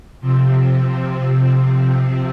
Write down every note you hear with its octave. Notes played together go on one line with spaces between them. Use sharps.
C3 F3 C4